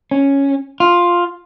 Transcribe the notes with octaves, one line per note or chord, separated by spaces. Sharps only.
C#4
F4